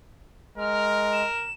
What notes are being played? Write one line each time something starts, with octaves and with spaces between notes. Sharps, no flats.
G#3 A#4 F6
E7